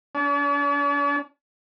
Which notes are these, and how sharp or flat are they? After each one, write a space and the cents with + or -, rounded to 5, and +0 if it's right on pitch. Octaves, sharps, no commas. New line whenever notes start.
D4 -45